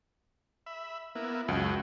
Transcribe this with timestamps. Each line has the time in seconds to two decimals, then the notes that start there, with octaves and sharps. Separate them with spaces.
0.66 E5 B5
1.15 A#3 B3 E4
1.48 C#2 F#2 F#3